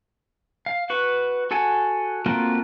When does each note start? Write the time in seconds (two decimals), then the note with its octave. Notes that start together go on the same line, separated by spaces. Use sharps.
0.66 F5
0.90 F#4 B4 C#6
1.51 F#4 A4 F#5 G#5
2.26 A3 A#3 C4 F4 F#4